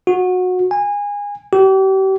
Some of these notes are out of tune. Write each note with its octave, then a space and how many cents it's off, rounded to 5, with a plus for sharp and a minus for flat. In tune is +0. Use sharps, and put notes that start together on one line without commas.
F#4 -20
G#5 -25
G4 -35